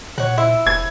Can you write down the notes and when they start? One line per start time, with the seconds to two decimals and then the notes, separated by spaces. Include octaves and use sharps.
0.18 A#2 C#5 F#5
0.38 E4 C5
0.67 E1 G#6